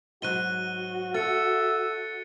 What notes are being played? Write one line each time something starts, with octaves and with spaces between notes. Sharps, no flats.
G#2 F#3 F#4 F#6 D#7 G7
A4 E5 A6 C#7